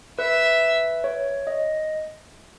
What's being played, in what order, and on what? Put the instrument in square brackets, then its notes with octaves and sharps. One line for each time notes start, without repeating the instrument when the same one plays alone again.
[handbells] B4 [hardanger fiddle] E5
[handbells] C#5
D#5